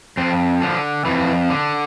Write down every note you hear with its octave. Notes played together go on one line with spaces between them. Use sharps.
F2 C4
D3 F3
F2 E3
D3